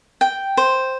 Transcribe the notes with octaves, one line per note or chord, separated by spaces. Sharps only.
G5
C5